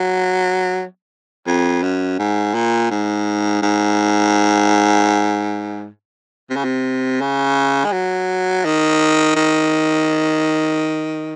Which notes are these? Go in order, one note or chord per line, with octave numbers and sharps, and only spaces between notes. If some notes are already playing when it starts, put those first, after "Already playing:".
Already playing: F#3
F2
F#2
G#2
A#2
G#2
G#2
C3
C#3
C3
C#3
G#3
F#3
D#3
D#3